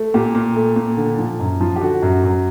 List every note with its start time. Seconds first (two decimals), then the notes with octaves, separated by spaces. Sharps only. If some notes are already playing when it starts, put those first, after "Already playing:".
Already playing: A3
0.14 A#2 G4
0.35 A#2
0.55 A3
0.76 A#2
0.97 D3
1.18 F3
1.40 F#2
1.61 F3
1.76 G4
1.81 D3 F#4
2.02 F#2
2.24 F#2